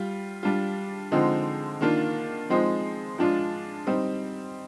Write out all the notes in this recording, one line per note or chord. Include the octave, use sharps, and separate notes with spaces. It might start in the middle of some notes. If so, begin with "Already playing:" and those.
Already playing: G3 F4
G3 D4 F4
D3 F3 G#3 C4 D#4
D#3 A#3 D4 F4
F3 G#3 C4 D#4
F3 G#3 D4 F4
G3 C4 D#4